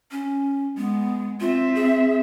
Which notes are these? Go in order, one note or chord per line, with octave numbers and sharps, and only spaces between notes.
C#4
G#3 B3
C4 F4 E5
G#4